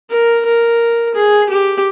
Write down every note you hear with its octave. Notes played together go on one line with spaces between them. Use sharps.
A#4
A#4
G#4
G4